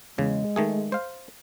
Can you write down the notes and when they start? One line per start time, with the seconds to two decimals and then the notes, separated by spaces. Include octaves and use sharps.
0.18 E2 C#3 G#3
0.56 D#3 A3 G#4
0.92 C5 F5